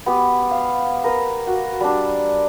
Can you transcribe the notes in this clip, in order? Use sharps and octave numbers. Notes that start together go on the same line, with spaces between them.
B3 G4
F5
A#4 B4
F#4
G3 D4